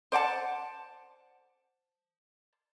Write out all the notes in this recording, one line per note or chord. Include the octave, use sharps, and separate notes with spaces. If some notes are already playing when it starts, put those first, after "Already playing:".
C5 D5 F#5 A5